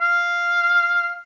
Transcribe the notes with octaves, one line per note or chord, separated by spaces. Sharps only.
F5